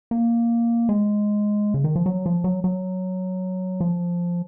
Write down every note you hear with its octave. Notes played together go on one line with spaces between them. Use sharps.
A#3
G#3
C#3
D#3
F3
F#3
F3
F#3
F#3
F3